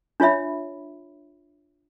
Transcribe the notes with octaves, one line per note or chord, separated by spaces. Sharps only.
D4 F4 C#5 E5 B5